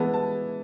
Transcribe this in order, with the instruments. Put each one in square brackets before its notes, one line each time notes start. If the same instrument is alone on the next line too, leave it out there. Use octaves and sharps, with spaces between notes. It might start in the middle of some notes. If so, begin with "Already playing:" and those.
Already playing: [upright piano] E3 G#3 B3 E4 A5
A5